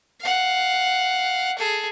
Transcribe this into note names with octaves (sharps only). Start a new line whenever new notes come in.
F5 F#5
G#4 A4